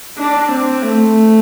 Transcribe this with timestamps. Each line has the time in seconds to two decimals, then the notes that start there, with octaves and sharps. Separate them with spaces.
0.18 D4
0.51 C4
0.82 A3